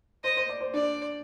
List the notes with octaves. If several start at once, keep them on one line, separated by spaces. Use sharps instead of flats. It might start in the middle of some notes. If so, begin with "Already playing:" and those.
C5 D#5
C5
D5
C5
D4 D5